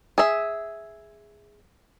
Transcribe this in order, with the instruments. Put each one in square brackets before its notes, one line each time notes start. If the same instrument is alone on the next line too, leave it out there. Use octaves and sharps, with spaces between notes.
[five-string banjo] G#4 E5